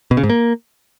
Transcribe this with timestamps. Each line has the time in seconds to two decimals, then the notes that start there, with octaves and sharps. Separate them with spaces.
0.11 B2
0.17 C#3
0.23 G#2
0.30 A#3